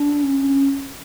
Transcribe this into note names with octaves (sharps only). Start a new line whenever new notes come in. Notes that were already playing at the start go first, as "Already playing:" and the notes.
Already playing: D4
C#4